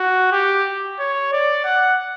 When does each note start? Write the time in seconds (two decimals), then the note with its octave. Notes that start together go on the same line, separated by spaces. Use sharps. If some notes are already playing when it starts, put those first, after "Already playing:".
Already playing: F#4
0.32 G4
0.99 C#5
1.33 D5
1.65 F#5